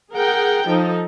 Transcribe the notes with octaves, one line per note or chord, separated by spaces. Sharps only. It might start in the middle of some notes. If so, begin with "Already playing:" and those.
G#4 A#4 F#5 G5
F3 D#4 A4